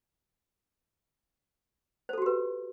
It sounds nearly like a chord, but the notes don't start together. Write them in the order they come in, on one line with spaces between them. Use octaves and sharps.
C5 A4 F#4 G4 B4